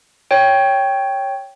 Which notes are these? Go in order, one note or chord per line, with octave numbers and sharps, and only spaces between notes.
C#5 G5